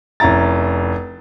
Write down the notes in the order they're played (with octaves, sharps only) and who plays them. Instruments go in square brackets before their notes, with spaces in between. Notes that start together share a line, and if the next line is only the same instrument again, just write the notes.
[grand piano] F1 C#4 E4 A#5 A6